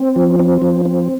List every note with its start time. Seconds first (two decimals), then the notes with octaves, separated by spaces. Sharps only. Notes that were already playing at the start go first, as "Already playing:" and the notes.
Already playing: C4
0.16 F3
0.39 C4
0.62 F3
0.85 C4